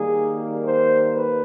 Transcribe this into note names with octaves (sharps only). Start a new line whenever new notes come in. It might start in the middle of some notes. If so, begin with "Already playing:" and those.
Already playing: D#3 G3 A#3 G#4
C5
B4